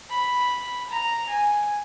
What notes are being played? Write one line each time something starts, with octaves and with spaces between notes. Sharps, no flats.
B5
A#5
G#5